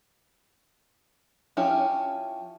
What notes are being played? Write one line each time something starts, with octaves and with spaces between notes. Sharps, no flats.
F3 C#4 E4 G4